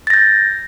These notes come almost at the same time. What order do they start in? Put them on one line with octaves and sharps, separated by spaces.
A6 A#6 G6